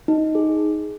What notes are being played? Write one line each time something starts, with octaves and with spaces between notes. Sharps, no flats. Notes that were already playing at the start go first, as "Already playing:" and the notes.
D#4
G#4